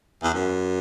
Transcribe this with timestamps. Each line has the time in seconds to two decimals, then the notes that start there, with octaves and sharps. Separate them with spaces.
0.23 E2
0.34 F#2